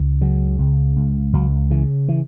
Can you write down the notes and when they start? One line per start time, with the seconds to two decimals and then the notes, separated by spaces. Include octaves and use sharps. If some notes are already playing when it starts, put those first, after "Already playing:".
Already playing: C#2
0.21 C#3 F#3
0.59 C#2
0.96 C#2
1.33 C#2 F#3
1.70 C#3 E3
2.09 E3